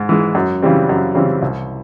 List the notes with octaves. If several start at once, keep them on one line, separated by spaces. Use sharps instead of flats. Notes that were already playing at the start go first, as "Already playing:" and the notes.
Already playing: G#2
E3 G#3
F#2
C#3 E3 G3 C4
F#2
C#3 E3 G3 C4
C2